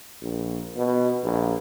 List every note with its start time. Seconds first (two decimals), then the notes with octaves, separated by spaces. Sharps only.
0.22 A#1
0.76 B2
1.23 A#1